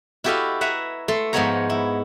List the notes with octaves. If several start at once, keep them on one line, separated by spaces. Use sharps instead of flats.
E4 F#4 G4 A4 D#5 F5
B4 E5 F#5 G#5 A#5
A3 A4 C6
G#2 F3 G#3 B3 C#5 A#5
E4